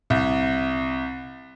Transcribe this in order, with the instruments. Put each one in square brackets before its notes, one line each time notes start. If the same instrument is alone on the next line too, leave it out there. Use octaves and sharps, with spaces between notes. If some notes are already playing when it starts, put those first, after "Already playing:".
[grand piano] C2